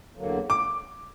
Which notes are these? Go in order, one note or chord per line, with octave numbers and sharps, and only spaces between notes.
E2 D3 F#3 A#3
D6